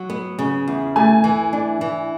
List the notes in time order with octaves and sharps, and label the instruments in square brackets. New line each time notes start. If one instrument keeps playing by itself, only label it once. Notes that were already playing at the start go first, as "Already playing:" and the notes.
Already playing: [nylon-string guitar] F#3
B3
C#3
E2
[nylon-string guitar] A3 [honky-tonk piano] G#5
[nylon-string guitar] E3
D4
E3